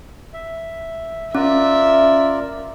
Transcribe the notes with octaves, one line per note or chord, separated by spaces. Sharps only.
E5
C#4 F4 A#4 D5 E5